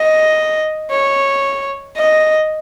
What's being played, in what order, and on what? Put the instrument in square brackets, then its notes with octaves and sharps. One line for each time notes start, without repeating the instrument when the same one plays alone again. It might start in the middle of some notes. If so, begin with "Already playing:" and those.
Already playing: [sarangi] D#5
C#5
D#5